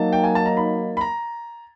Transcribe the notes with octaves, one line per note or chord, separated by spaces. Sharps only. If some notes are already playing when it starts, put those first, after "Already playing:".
Already playing: F#3 A#3 D#4 A5
G5
G#5
A5
A#5
B5
B5
A#5